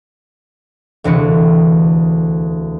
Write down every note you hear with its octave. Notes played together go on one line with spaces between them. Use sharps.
E1 D2 C3 E3 C#7